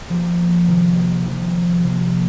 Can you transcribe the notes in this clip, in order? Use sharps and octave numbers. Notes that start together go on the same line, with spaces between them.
F3 A#3 G4
C3 D#3 G3 A#3 F4
C3 F3 D#4 G4
C3 F3 A#3 F4